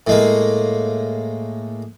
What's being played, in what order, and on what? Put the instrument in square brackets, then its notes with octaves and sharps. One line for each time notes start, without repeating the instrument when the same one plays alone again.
[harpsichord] A2 G#3 A#3